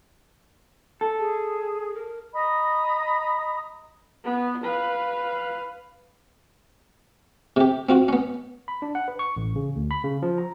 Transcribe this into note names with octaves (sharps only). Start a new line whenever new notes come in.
A4
G#4
A#4
D#5 A#5 B5 D#6
B3
B4 F5
C3 G4
C4 F4 F#4
B3 C#4
B5
D4
F#5
B4
C#6
A1
C#3
D2
B5
C#3
F3
A#5